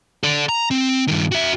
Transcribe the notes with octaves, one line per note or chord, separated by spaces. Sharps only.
A4 D5
A#5
C4
G2 D#3
F#4 E5